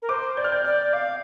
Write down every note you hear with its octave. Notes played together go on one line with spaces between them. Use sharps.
A#4
C5 D6
D5 G6
F6
G6
D5 F6
F5 D6